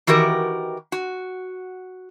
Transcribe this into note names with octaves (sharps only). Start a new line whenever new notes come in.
D#3 E3 F#4 G4 A#4
F#4